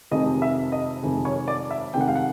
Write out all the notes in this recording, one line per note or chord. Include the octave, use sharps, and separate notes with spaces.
F1 F2 C3 D#3 G#3 D#5
E5
D#5
F1 F2 C3 D#3 G#3
C#5
D5
E5
F1 F2 C3 D#3 G#3 G5
F#5
F5
F#5